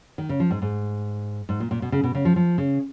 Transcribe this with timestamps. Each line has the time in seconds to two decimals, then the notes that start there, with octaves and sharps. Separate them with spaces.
0.18 D#3
0.29 C#3
0.40 F3
0.51 G#2
0.62 G#2
1.49 G#2
1.60 A#2
1.71 A#2
1.82 B2
1.92 C#3
2.04 B2
2.15 C#3
2.25 F3
2.36 F3
2.58 C#3